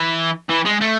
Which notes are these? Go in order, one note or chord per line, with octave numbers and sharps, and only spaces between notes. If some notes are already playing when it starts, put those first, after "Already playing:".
Already playing: E3
E3
G#3
A3